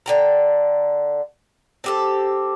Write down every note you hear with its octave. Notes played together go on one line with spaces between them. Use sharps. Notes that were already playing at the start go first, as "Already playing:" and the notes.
D3 G5 A#5
C4 G4 A4